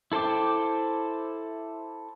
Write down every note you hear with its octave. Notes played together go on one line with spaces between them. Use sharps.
E4 A4 C5 G5 D6